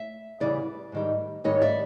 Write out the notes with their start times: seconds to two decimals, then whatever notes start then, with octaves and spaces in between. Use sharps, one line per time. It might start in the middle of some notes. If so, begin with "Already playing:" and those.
Already playing: E5
0.40 E2 C#3 E3 G3 D5
0.92 G#2 D#3 G3
1.44 G#2 D#3 G3 C#5 D#5
1.62 D5 E5